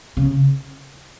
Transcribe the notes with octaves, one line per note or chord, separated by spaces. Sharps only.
C#3